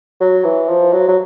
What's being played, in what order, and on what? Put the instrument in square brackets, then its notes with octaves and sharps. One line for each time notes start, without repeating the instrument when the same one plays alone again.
[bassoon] F#3
E3
F3
F#3
F#3